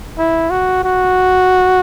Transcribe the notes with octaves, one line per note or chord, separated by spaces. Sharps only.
E4
F#4
F#4